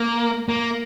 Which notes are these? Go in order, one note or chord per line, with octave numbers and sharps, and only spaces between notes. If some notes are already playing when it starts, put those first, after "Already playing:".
Already playing: A#3
A#3